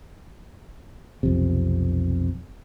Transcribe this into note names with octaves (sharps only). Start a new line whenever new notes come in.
B1 F2 C3